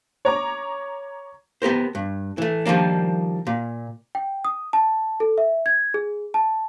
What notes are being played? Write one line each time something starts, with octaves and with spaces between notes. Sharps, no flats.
C#5 A#5 D6
B3 G4 A#4 C5
G2
E3 A3
D#3 F3 G3 A#3 D4
A#2
G5
D#6
A5
A4
E5
G#6
G#4
A5